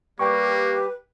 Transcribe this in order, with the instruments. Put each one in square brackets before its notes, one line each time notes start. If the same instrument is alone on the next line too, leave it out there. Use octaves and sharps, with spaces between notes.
[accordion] G3 G4 [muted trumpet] A#3 [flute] B4 [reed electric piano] G5 C#6